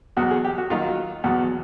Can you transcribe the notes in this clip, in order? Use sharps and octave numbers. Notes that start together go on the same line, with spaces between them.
E2 B2 F#3 F#4
G#4
G4
F#4
D#2 D#3 F#3 F4
E2 B2 F#3